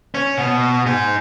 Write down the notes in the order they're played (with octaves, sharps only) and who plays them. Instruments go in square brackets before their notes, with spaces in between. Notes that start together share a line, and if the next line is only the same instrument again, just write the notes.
[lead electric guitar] C#4
B2
D#4 G#4